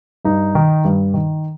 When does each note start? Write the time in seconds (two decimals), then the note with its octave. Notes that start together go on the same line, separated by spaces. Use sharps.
0.25 G2 D#4
0.55 D#3
0.85 G2
1.14 D#3